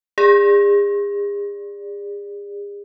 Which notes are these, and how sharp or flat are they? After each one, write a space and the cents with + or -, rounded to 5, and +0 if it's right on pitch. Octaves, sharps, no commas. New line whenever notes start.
G#4 -40 D5 +0